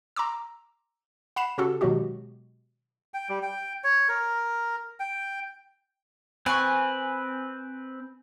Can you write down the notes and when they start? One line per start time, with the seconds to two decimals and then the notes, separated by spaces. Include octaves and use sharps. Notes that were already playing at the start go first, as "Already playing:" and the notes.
0.16 A#5 C6 D6 E6
1.36 F#5 B5 C7 E7
1.58 C#3 C#4 F#4 G4 A4
1.81 B2 D#3 F#3 G#3 F#4 G4
3.14 G5
3.29 G3
3.43 G5
3.84 C#5
4.09 A#4
5.00 G5
6.46 C4 B4 G#5 C#6